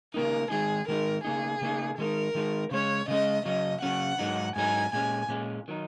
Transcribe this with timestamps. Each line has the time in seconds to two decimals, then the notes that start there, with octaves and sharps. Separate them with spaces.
0.14 C#3 A#3 D#4 A#4
0.50 D#3 G#3 D#4 G#4
0.88 D#3 G#3 D#4 A#4
1.24 C#3 A#3 D#4 G#4
1.61 C#3 A#3 D#4
1.97 D#3 G#3 D#4 A#4
2.35 D#3 G#3 D#4
2.71 C#3 G#3 C#4 C#5
3.08 C#3 G#3 C#4 D#5
3.45 C#3 F#3 C#4 D#5
3.82 C#3 F#3 C#4 F#5
4.19 G#2 F#3 D#4
4.56 G#2 F#3 D#4 G#5
4.92 A#2 G#3 C#4 G#5
5.29 A#2 G#3 C#4
5.68 D#3 F#3 D#4